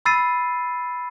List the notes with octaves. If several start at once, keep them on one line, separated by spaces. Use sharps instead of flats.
B5 E6 A6 C7 D#7